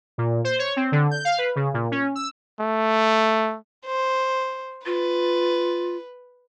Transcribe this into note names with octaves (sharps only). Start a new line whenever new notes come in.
A#2
C5
C#5
C4
D3
G6
F5
B4
C#3
A#2
C#4
E6
A3
C5
F4 B4